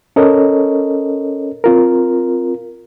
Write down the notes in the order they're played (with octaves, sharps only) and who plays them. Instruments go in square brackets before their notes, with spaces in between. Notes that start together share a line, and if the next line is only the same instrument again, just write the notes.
[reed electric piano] C#4 A4 A#4 C#5 D#5
C4 F4 A#4